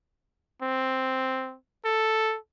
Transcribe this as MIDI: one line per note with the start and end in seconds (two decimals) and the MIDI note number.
0.63 1.56 60
1.85 2.37 69